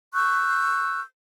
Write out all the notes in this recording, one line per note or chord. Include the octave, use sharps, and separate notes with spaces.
C#6 E6 F#6 G6